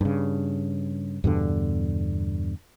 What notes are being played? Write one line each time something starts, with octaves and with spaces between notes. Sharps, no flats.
G2 C#3
E2 G2 B2 D3